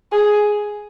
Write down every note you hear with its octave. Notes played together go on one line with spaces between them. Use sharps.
G#4